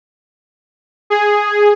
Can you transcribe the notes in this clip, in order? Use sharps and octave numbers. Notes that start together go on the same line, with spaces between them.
G#4